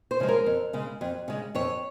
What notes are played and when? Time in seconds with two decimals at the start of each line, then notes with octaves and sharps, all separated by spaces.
0.11 C5
0.20 C#3 F3 G#3
0.28 A#4
0.46 F2
0.73 C#3 G#3
1.01 F2
1.28 C#3 G#3
1.55 F2 C#5